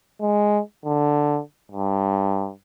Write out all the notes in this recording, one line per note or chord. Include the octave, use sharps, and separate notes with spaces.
G#3
D3
G2